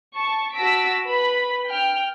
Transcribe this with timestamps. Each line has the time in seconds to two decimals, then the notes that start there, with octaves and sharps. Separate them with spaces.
0.15 A5 C#6
0.55 F#4 A5 E6 A#6 B6 D7
1.05 B4 B5 B6
1.69 G5 F6